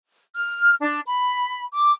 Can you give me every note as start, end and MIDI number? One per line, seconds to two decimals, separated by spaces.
0.35 0.72 89
0.81 1.00 62
1.06 1.62 83
1.73 1.92 86